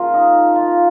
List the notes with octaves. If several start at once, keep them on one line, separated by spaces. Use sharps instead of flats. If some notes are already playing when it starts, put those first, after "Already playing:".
Already playing: C#3 F3 A#3 F4 A#4
D#4
F4